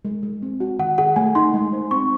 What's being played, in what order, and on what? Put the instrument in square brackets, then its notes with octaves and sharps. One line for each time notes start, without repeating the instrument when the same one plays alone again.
[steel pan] G#3
G#3
C4
F#4
[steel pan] D#3 [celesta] F#5
[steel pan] G#4 [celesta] F#5
[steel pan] A3 [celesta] G#5
[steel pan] D#4 [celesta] C6
[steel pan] G#3
C5
[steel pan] C4 [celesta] C#6